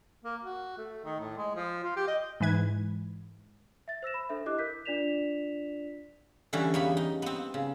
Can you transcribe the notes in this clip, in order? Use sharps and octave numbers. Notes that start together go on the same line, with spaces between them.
A#3
F#4
A3
D#3
A2
G#3
F3
F4
G4
D#5
G#2 E3 B4 G#6
E5 A6
C5 E6 A#6 E7
B5
D4 A4 C5 E5
E4 G4 D#5 D6 F#6
A#4 G6 B6
D4 F4 D5 B6 E7 F7
D3 E3 G3 C#4
E2 A#3 B3 C#5 B5
D#4
B3 C4
C#3